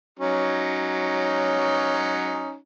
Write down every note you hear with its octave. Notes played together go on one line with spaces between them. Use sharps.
F#3 C#4 D#4